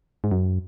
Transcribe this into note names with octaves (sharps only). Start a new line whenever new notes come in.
G#2
F#2